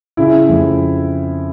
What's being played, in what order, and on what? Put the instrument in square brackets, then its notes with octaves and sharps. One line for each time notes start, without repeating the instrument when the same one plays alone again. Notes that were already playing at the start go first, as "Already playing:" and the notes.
[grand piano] C#3 E4
F2